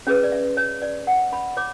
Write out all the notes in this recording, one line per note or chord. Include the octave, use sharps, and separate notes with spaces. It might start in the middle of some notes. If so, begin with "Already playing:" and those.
C#4 G#4 B4 C#5
D5
E5
C#5
D5
F#5
B5
C#5 D6